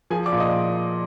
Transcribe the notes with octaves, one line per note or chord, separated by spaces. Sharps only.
F3 G#4 G#5
D5 D6
A#2
D#5 D#6